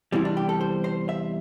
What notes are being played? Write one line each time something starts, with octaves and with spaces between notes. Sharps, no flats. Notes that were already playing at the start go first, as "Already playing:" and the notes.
E2 C3 E3 G3 E4
D4
G4
A4
C5
C5
E5